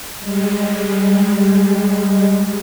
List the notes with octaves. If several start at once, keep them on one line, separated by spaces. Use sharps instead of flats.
G3 G#3